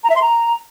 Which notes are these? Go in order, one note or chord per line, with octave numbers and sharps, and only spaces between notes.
A#5
E5
C6
A#5